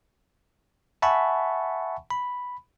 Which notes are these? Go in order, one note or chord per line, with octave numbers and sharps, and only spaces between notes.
E5 F#5 G#5 A5 B5 C#6
B5